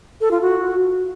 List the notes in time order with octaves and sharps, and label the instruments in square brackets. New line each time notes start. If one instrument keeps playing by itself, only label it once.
[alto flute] A4
F4
F#4